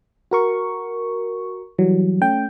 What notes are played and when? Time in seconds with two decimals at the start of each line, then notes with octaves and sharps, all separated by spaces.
0.31 F#4 A#4 C#6
1.79 E3 F#3 G3
2.21 A3 C#4 G5